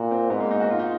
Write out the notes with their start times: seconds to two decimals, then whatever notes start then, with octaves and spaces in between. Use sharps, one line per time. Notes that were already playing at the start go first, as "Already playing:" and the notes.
Already playing: A#2 F#4
0.11 C4
0.30 G#2 B3
0.40 A#3
0.51 D#4
0.60 F#4
0.70 F4
0.79 D#4